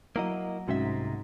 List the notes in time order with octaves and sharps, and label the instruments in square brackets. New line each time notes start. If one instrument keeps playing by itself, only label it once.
[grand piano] F#3 A#5 [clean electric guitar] A#3 E4 D#5
[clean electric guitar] C2 C3 E5 [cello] G#2 [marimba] G#3 C#4 F#4